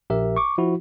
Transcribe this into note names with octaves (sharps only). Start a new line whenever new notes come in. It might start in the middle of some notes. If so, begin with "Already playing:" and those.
A#1 G4 A#4 E5
C#6 D6
F3 E4 F#4